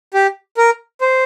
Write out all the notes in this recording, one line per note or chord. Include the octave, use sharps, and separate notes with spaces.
G4
A#4
C5